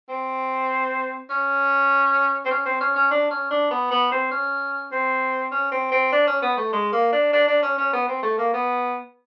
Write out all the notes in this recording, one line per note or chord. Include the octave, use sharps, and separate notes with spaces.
C4
C#4
C4
C#4
C4
C#4
C#4
D4
C#4
D4
B3
B3
C4
C#4
C4
C#4
C4
C4
D4
C#4
B3
A3
G#3
A#3
D4
D4
D4
C#4
C#4
B3
C4
A3
A#3
B3